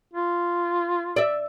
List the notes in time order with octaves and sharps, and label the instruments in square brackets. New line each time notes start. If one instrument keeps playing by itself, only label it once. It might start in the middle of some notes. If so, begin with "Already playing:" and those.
[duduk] F4
[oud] D5 E5